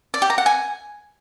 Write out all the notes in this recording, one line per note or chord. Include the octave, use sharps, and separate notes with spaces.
D5
G4
A#5
F#5
G#5